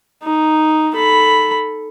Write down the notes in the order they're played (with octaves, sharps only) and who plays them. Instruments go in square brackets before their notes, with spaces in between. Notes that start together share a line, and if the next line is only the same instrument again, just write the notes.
[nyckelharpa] D#4
A4 B5